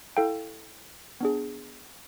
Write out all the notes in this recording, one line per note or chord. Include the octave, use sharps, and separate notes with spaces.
E4 A4 F5 G5
B3 D4 G#4